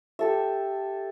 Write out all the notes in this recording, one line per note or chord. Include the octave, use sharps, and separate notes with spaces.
G4 A4 E5